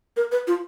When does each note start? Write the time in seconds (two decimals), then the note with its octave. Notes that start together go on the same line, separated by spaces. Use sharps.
0.17 A#4
0.32 B4
0.47 F4